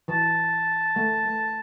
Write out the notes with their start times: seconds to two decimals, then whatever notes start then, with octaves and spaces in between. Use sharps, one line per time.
0.08 E3 A5
0.96 A3
1.25 A3